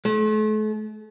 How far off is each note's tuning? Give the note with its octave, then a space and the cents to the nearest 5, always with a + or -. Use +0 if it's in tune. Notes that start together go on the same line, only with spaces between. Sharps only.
A3 -40